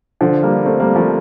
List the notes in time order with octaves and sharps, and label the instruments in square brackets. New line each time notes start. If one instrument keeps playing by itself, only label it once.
[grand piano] D3 F3
G3 A#3
A3 C4
G3 A#3
F3 A3